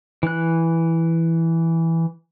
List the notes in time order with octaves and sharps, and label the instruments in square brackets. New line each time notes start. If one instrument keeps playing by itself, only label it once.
[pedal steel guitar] E3 F#6